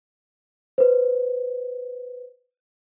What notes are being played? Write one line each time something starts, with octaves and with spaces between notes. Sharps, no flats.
B4 C5